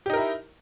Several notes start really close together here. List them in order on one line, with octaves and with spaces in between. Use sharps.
G4 D#4 A#4 E4